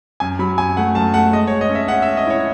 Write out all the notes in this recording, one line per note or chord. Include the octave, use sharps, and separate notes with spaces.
F#2 G#5
F#3 B5
F#2 G#5
A3 F#5
F#2 A5
A3 F#5
G#3 D#5
C#5
G#3
D#5
C#4
E5
C#4 F#5
E5
C#4
D#5
E4 C#5